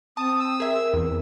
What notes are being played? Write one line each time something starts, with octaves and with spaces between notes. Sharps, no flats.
C4 A5 D#6
E6
G#4 A#4 E5
E2